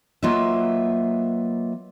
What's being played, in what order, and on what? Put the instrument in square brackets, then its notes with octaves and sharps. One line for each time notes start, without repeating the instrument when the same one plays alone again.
[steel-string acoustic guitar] F#3 A#3 F4 B4 D#5 E5